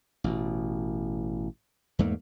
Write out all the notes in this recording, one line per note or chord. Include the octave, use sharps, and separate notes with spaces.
A1 B2
E2 G#2 A3 A#3